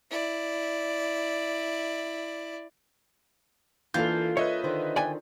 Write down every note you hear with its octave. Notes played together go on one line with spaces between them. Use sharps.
E4 D5
E3 A#3 D4 F4 A4 G6
B4 C#5 D#5 E5
D3 D#3 C5
D5 G5 G#5